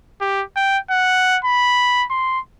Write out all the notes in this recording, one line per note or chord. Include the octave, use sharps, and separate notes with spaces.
G4
G5
F#5
B5
C6